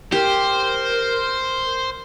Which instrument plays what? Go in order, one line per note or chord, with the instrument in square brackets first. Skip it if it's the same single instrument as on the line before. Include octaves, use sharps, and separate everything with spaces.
[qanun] G4 [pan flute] A#4 [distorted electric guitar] C5